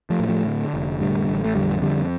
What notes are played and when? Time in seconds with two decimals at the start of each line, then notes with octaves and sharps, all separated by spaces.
0.10 F3 A3
0.20 A2
0.28 F3 A3
0.47 D3
0.74 F1
1.00 A2 D3 G3
1.28 A1
1.44 A3
1.55 F2 D3 G3
1.82 F2 D3 G3